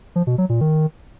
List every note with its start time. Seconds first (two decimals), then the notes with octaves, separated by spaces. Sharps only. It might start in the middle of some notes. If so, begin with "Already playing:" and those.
0.16 F3
0.27 B2
0.38 F#3
0.49 A#2
0.61 D#3